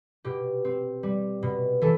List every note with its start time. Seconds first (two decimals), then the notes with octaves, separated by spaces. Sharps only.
0.24 B2 G4
0.65 C4
1.03 G3
1.42 B2
1.81 E3 A4